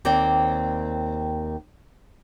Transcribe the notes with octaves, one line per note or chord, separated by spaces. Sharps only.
D#2 A#3 C4 D5 G5